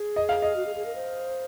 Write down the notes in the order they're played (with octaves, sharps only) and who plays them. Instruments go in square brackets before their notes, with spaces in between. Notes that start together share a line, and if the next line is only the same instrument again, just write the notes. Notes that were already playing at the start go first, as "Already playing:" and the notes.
Already playing: [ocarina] G#4
[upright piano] D#5
F5
D#5
[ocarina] F#4
G#4
G#4
A#4
C5